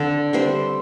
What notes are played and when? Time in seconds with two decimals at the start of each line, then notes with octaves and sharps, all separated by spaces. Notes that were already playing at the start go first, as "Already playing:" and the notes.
Already playing: D3 C4 A4 D5
0.33 G3 C4 C5 E5